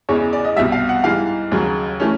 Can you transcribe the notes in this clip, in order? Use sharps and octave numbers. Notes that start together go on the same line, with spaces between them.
E2 C#3 E3 G#3 C#5
D5
D#5
C2 B2 G3 E5
F5
F#5
G#2 E3 G3 F5
D#2 C#3 F#3
E3 A3 C#4